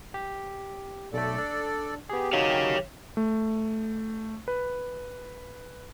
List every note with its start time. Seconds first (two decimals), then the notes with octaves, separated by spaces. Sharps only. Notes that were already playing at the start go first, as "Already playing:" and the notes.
0.14 G4
1.13 B1 A3 A4 D5
1.38 D4
2.09 B3 G4 G#4
2.33 D#3 F#3 C#5 F5
3.17 A3
4.48 B4